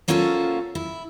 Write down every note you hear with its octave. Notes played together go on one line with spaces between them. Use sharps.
A#3 C#4 F4 F#4 A4 C5
E4